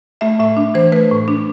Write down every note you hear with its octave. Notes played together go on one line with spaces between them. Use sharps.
A3 E5
A2 E5
D4
E3 C5
A3 B4
A2
D4